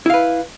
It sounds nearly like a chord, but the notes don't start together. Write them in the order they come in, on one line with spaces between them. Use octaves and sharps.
E4 F5 B4